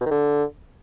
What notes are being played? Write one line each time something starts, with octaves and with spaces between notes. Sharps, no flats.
B2
D#3
D3